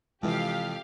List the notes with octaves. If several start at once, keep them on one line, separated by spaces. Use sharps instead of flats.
F2 C3 E3 F3 G#3 G4 F5